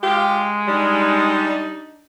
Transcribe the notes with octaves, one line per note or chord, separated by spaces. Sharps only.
G#3 F4 G4
G3 D4 D#4